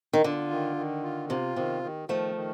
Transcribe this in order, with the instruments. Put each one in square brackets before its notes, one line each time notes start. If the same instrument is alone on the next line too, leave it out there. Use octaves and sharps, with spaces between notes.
[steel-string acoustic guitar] D#3
[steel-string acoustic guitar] D3 [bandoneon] F4
[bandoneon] D#3
D#3
F4
[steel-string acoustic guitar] C3 [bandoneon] F4
[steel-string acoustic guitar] C3 [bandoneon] D#3
[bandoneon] D#3
[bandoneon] D#3 [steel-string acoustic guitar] F3 A3
[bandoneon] D#3